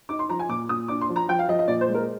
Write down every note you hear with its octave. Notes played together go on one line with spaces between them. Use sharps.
D#4 D6
C6
F3 A#5
G#5
A#2 D6
A#2 D#6
D4 D6
C6
F3
A#5
F3 G5
F5
F3 D#5
D#5
A#2 D5
C5
G#3
A#4